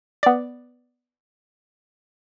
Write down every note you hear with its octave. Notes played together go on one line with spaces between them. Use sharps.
B3 D5